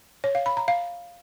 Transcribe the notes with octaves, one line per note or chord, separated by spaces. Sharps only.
C#5
F5
B5
A#5
F5